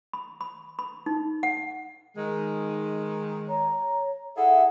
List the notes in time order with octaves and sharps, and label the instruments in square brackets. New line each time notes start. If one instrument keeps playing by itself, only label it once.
[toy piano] B5
B5
B5
D#4
F#5
[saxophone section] D#3 G#3
[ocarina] C#5 [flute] A#5
[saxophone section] E4 G#4 A4 [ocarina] E5 [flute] F#5